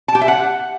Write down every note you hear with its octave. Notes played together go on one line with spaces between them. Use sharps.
A5
G4
E5
F#5